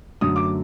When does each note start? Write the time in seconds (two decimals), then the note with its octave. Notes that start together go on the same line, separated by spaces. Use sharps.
0.21 F#2 D3 F#3 A3 D#6
0.36 D6